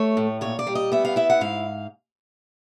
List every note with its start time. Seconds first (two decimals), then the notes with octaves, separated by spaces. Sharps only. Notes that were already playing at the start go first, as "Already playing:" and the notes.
Already playing: A3 C#5
0.17 A2
0.41 A#2 C#5
0.59 D5
0.67 G3
0.75 D#5
0.92 B3 E5
1.05 F5
1.16 E4 E5
1.30 F#5
1.41 G#2 F5